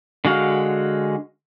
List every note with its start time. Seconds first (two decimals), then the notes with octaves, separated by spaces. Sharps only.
0.25 D3 G#3 F#4 F5